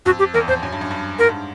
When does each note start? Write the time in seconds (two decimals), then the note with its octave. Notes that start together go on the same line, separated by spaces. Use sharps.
0.06 F2 F#4
0.19 G4
0.34 E2 A#4
0.48 F2 C5
0.63 F#2
0.72 G2
0.81 F#2
0.91 G2
1.19 G#2 A#4
1.29 G2